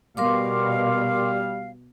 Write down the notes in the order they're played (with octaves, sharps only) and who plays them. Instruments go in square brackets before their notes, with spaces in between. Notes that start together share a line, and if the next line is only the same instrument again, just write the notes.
[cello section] B2 [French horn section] G3 [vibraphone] A#4 C6 D6 [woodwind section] F5